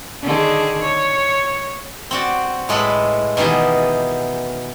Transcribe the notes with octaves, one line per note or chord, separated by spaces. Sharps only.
D3 D#3 G#4
C#5
C4 F#4 D5
A2 G#3 A4 B4 B5
B2 D#3 E3 G4 G#4